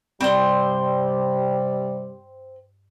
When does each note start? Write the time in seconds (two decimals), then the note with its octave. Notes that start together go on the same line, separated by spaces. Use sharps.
0.21 G2 C3 G3 C4 C5 D5